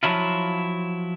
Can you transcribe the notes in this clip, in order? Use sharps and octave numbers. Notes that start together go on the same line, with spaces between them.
F3 F#3 E4 F4